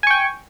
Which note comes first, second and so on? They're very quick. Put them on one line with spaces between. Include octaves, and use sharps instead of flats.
G#5 C#6 G5